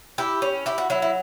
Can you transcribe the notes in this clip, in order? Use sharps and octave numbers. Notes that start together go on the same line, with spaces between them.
E4 G4
C#4
E4 G4
F#4
F#3 E4
E4